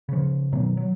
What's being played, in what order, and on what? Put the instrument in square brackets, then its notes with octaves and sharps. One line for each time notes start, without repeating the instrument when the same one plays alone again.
[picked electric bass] C#3 F3
B2 D#3 F#3
F#3